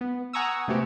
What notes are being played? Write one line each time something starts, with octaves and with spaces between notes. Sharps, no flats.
B3
F#5 G#5 A#5 C#6 D#6 E6
C3 A3 B3 C4 F#4 G4